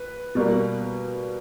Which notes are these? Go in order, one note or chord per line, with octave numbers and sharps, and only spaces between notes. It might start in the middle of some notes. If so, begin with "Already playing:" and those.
Already playing: B4
B2 G3 A#3